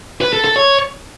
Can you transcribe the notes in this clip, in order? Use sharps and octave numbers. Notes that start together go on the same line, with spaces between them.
B4
A4
A4
C#5